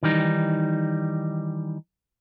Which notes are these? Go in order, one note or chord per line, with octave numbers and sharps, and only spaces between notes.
D#3 E3 G3 D#4